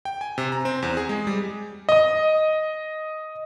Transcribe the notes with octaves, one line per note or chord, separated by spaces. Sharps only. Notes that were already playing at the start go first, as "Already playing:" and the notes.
G5
G#5
C3
A#5
C4
E2
G#4
G#3
G3
D#5 D#6